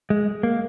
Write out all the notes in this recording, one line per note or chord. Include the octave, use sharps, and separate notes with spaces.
G#3
A#3